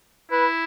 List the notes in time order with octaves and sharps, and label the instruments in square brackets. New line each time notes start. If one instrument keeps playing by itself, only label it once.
[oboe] E4 [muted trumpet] B4